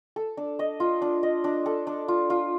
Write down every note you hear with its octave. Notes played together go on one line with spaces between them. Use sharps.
A4
D4
D#5
F4
D4
D#5
D4
A4
D4
F4
F4